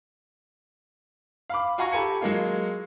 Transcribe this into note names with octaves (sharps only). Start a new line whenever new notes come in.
F5 B5 D6
F4 F#4 F5 G#5 A#5 C#6
G4 A4 G#5 B5 G#6 C#7
F#3 G#3 A#3 F4